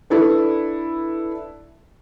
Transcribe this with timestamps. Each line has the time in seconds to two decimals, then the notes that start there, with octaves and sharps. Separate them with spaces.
0.10 D4 E4 A4 B4